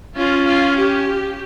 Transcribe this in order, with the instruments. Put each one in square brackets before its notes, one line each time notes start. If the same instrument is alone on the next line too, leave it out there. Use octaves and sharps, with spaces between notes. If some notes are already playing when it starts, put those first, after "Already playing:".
[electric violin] C#4 [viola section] F4
[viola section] F4
G4